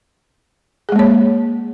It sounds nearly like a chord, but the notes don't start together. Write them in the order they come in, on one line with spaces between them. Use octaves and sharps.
G#4 G#3 A#3 C#5